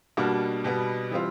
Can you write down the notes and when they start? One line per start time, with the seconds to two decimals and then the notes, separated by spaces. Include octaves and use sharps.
0.17 B2 G3 A#3 D4 F#4
0.64 B2 G3 B3
1.11 E3 G3 C4 F4